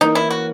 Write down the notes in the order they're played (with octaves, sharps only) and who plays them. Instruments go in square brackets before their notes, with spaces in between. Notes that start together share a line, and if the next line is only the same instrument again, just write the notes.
[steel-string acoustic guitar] E3 A#3 C#4 [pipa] D#4
[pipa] E4
F#4